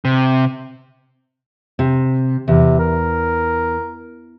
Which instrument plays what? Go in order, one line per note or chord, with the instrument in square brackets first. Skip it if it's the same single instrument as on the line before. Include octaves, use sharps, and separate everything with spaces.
[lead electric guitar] C3
[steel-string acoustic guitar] C3
[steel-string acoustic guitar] E2 [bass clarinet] C3
[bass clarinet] A#4